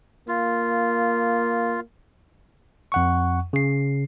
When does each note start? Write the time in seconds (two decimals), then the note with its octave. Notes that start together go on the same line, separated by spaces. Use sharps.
0.28 A#3 F4
2.92 F2 F#5 C#6
3.53 C#3 C7